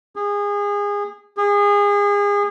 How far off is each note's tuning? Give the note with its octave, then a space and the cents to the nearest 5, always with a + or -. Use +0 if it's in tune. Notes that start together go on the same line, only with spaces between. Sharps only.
G#4 -25
G#4 -30